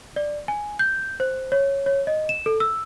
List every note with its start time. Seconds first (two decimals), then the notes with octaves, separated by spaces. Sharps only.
0.16 D5
0.48 G#5
0.79 G6
1.20 C5
1.52 C#5
1.86 C#5
2.07 D#5
2.29 E7
2.46 A4
2.60 E6